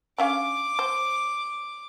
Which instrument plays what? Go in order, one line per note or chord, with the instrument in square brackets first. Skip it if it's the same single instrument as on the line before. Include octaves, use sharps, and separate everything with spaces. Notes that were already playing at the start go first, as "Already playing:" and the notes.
[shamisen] D3 C#4 F5 [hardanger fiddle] D6
[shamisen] C5